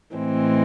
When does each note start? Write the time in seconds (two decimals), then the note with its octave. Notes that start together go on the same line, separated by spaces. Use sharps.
0.14 A2 E3 G#3 C4